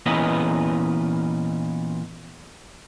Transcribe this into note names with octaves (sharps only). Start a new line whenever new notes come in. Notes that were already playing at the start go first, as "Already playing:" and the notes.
A#2 E3 B3 C#4 B4 D#5